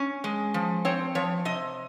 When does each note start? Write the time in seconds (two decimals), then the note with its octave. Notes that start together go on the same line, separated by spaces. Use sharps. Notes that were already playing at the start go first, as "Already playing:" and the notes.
Already playing: C#4
0.24 G#3
0.54 F3
0.85 C4 C#5
1.15 F3 C#5
1.45 C3 D#5